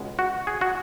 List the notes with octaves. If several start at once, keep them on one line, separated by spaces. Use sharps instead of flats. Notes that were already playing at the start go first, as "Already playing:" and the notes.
Already playing: C#2 B2 G#3
F#4
G#4
F#4